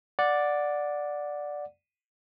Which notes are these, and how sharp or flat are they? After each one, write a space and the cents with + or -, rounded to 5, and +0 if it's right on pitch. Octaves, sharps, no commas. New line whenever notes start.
D5 +0 F#5 -15